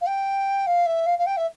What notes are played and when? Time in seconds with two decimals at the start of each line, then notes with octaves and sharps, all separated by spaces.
0.01 F5
0.06 G5
0.66 F5
0.86 E5
1.06 F5
1.18 F5
1.26 G5
1.36 E5